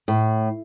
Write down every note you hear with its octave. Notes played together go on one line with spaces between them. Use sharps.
A2